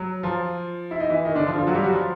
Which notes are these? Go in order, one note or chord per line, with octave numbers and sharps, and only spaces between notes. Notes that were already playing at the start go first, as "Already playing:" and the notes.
Already playing: F#3
F3 F4
E4
D#4
E3 E4
D#3 D#4
D3 D4
F3 F4
F3 F4
F#3 F#4
G3 G4
F#3 F#4
F3 F4